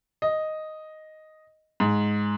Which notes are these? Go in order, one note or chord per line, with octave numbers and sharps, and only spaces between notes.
D#5
G#2